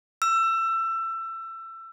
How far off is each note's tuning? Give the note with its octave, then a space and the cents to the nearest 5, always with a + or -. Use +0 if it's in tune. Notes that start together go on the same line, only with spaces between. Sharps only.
E6 +25